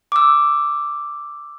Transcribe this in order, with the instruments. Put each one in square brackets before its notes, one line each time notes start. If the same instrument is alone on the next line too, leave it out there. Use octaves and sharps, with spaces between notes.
[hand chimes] D6 E6